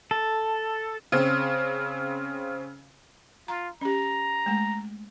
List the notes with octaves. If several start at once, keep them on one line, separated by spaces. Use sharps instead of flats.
A4
C#3 C4
F4 A#5
C#4 G4 A#5
G#3 A3